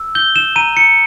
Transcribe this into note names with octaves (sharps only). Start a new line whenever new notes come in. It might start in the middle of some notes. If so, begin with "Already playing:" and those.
Already playing: E6
G6 G7
E7
A#5 D#7
C#7